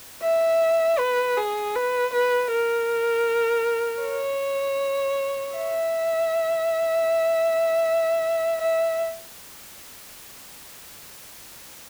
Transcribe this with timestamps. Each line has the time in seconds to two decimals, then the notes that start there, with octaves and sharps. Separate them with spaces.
0.23 E5
0.99 B4
1.37 G#4
1.75 B4
2.13 B4
2.51 A#4
4.04 C#5
5.57 E5
8.61 E5